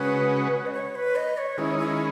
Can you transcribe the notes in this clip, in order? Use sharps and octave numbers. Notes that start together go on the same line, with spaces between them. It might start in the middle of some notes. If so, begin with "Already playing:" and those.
Already playing: C#3 G#3 C#4 F#4 B4
D#5
C#5
B4
D#5
C#5
D#3 G#3 C#4 E4
E4